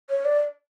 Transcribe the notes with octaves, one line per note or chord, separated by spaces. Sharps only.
C#5
D5